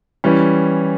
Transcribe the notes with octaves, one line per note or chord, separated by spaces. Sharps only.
E3 G3 C#4